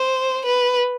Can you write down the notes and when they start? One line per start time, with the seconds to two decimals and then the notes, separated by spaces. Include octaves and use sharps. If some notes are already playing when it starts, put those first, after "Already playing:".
Already playing: C5
0.46 B4